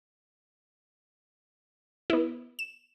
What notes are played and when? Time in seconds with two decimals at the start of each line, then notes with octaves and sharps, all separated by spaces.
2.10 B3 E4
2.59 E7